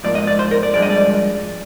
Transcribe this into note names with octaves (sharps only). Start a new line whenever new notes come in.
G#2 F3 A#3 D5
D#5
D5
C5
A#4
D5
G2 F3 G#3 D5
D#5
D5